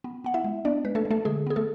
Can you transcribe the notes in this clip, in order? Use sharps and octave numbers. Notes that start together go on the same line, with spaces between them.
B3
B3 F#5
E4 E5
G#3
B3 D4 D5
G#3 B4
A3 A4
G#3
A3 A4
D3 G#3 G#4
B3 G#4
A3 A4